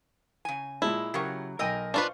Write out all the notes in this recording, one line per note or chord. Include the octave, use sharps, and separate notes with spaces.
C#3 G#5
A#2 G#3 E4 A5
C#3 F#3 G4 A#4 C#6
B1 A#4 D#5 G5 G#5 E6
D4 F4 B4 C5 F5 C#6